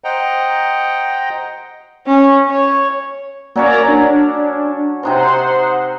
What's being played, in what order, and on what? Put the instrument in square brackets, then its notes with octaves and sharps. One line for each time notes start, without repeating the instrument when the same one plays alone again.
[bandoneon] C5 D#5 F#5 G5 A#5
[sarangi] C#4
C#5
[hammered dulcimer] F#3 C#4 C#5 [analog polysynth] A#3 D5 A#5
[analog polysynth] D4
[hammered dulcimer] C3 D#4 A#5 [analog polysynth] C5 F#5 C6